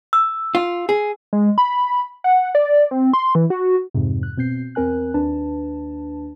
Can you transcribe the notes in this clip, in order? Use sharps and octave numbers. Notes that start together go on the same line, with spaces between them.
E6
F4
G#4
G#3
B5
F#5
D5
C4
C6
E3
F#4
F2 G#2 C3
F#6
B2 C4 G6 C7
E2 C4 A#4 G#5 F#6
D#2 D4 B4 A5